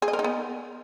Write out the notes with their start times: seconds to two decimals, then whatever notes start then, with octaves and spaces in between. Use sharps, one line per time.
0.02 G#4
0.08 D#5
0.13 A#4
0.19 D#4
0.24 B3